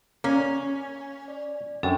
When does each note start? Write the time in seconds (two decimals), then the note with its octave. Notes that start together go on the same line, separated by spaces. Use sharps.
0.24 A#3 C#4
1.28 D5
1.83 F#2 C4 D4 A4 G5 C#6